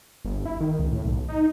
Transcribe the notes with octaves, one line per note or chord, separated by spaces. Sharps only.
G1
E4
D#3
C#2
A2
B1
D#4